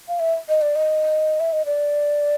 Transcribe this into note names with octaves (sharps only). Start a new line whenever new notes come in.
F5
E5
D#5
D5
D#5
E5
D#5
D5